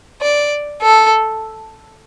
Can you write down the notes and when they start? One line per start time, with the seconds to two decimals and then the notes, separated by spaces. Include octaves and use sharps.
0.22 D5
0.82 A4